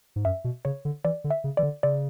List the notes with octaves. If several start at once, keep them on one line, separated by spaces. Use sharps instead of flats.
G#2
F#2 E5
B2
C#3 C#5
D3
E3 D5
D3
E5
C#3
E3 D5
D3
C#3 D5